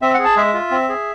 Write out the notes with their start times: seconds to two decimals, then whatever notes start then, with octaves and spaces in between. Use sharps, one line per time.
0.02 C4 E5
0.14 G#4 F#5
0.25 A5
0.36 G#3 E5
0.54 F4
0.71 C4
0.89 G#4